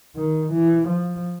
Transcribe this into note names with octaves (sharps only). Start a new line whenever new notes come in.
D#3
E3
F3